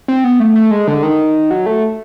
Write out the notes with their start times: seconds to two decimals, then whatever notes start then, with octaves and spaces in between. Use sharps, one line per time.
0.08 C4
0.24 B3
0.40 A3
0.56 A3
0.71 G#3
0.88 D3
1.03 D#3
1.51 F#3
1.66 A3